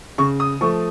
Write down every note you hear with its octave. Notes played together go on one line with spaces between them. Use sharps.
C#3 C#6
D#6
F3 A3 C#6